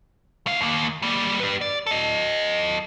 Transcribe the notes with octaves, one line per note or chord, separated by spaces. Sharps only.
A3 F5
D#2 A#3
G3 A#3
G4 B4
D5
A4 D#5